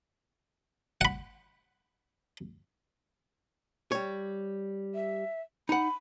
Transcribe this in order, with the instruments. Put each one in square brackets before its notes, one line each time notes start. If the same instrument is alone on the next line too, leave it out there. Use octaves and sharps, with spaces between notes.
[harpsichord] F#5 B5
[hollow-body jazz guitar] G3 C#5
[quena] E5
[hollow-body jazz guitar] D#4 F#5 [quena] B5